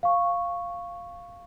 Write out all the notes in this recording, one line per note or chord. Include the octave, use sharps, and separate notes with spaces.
F5 C#6